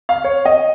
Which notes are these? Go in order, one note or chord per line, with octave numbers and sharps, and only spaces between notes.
F5
C#5
D#5